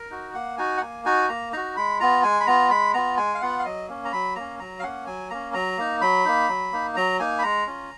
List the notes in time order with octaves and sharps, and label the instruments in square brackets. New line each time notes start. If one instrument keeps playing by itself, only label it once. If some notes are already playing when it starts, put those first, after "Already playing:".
Already playing: [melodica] A#4
D#4 F#4
A#3 F#5
D#4 F#4 G#5
F#5
A#3 G#5
D#4 F#4 G#5
A#3 A#5
D#4 F#4 A#5
G#3 B5
B3 F4 A#5
G#3 G#5
B5
B3 F4 A#5
G#3 B5
B3 F4 A#5
G#3 G#5
F5
B3 F4 F#5
F5
F#3 D#5
A#3 C#4
A#5
F#3 B5
A#3 C#4 A#5
F#3 A#5
F5
A#3 C#4 F#5
F#3 G#5
A#3 C#4 A#5
F#3 A#5
A#3 D#4
F#3 B5
A#3 D#4
F#3
A#3 D#4
F#3 A#5
A#3 D#4 G#5
B5
G#3 A#5
C#4 F4